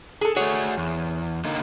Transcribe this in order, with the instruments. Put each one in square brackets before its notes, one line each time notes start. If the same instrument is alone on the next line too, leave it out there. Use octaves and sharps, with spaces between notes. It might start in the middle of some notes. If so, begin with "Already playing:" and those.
[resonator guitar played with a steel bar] G#4 A4
[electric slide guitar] A3 F#4 [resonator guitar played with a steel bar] G#4 C#5
[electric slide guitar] E2
D3 A#3 D#4